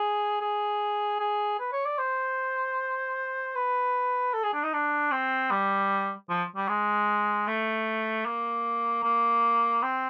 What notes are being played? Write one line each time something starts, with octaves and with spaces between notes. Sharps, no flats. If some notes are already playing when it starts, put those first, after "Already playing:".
Already playing: G#4
G#4
G#4
B4
C#5
D5
C5
B4
A4
G#4
D4
D#4
D4
C4
G3
F3
G3
G#3
A3
A#3
A#3
C4